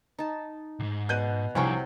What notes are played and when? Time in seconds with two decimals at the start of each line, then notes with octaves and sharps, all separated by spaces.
0.19 D#4 A5
0.80 B1 G#2
1.09 B2 F#6 G6 D#7
1.55 C2 C3 F3 F#3 D4 G5 G#5 C#6